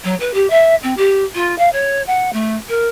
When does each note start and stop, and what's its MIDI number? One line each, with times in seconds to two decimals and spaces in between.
0.04 0.15 54
0.20 0.31 71
0.34 0.47 67
0.50 0.75 76
0.83 0.94 60
0.97 1.23 67
1.35 1.55 65
1.59 1.69 77
1.73 2.01 73
2.07 2.30 78
2.33 2.56 57
2.69 2.88 70